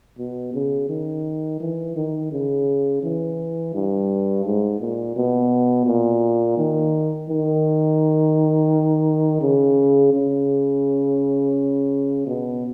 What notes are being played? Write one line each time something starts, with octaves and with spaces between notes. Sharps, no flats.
B2
C#3
D#3
E3
D#3
C#3
E3
G2
G#2
A#2
B2
A#2
D#3
D#3
C#3
C#3
B2